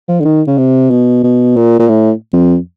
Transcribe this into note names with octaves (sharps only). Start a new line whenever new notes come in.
F3
D3
D#3
C#3
C3
B2
B2
A#2
A#2
A2
F2